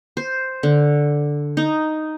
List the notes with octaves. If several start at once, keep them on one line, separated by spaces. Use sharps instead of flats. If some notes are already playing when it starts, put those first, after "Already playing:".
C5
D3
D#4